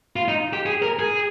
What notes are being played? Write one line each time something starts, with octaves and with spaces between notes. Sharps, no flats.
F4
D#4
G4
G#4
A#4
G#4